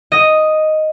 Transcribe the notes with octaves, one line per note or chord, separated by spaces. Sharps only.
D#5